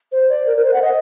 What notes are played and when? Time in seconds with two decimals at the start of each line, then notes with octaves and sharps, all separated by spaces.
0.12 C5
0.29 D5
0.46 A#4
0.57 A#4
0.64 C5
0.73 F#5
0.82 D#5